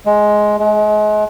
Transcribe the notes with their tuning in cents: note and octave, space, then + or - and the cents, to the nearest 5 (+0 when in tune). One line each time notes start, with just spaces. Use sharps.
G#3 +10
G#3 +35